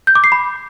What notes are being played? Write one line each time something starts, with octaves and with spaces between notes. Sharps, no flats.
G6
D6
C7
B5